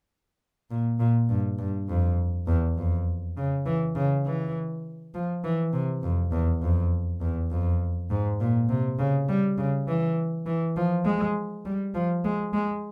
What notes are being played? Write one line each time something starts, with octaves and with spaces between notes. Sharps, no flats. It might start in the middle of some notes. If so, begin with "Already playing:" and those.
A#2
A#2
G2
G2
F2
E2
F2
C#3
E3
C#3
E3
F3
E3
C3
F2
E2
F2
E2
F2
G#2
A#2
C3
C#3
G3
C#3
E3
E3
F3
G#3
G3
F3
G#3
G#3